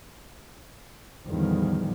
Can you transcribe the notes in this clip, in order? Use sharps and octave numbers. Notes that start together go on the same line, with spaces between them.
E2 A2 D3 D#3 F3 G3